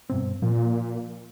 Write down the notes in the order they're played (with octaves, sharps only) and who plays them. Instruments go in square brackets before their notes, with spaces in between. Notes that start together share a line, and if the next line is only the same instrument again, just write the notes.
[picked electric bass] G2 B2 C4
[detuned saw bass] A#2 [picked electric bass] F3